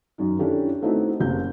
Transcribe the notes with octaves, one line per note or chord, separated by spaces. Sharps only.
F#2 D#3
C#4 D4 E4 G4 A4
A3 B3 C4 D#4 E4 F#4
F#1 C3 A#3 G6